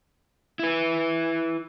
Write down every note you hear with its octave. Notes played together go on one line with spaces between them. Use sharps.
E4 B4